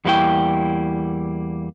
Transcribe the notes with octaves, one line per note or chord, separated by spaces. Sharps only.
E2 G3 A#3 D#4 E4 G5